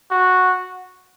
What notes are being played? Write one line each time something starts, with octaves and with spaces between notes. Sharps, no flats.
F#4